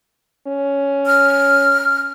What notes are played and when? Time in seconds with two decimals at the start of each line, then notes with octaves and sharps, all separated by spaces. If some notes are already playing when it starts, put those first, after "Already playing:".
0.47 C#4
1.06 F6